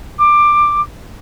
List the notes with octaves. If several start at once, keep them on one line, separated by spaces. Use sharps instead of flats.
D6